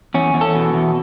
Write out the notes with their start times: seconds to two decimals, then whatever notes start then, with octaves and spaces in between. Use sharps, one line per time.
0.14 E2 C#4
0.34 E2
0.41 A4
0.55 B2
0.74 E2